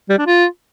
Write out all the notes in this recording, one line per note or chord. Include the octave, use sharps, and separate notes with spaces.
G3
D4
F4